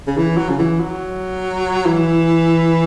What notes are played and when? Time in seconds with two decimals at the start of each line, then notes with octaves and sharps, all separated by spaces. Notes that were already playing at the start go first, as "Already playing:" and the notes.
0.07 C#3
0.17 E3
0.37 F#3
0.49 C#3
0.59 E3
0.80 F#3
1.86 E3